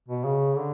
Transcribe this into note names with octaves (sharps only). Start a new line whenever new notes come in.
B2
C#3
D3